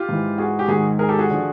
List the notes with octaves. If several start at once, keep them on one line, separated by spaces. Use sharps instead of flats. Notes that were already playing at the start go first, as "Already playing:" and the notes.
Already playing: F4 G4
G#2 E3
F#4 G#4
G4
G#2 D#3 F#4 G#4
G#4 A#4
G4 A4
F#4 G#4
D3 F3